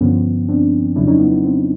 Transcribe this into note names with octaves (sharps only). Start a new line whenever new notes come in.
G2 D3 F3 B3 C#4
C4 D4
F2 C#3 F#3 D4 E4
C#4 D#4
B3
B3
C4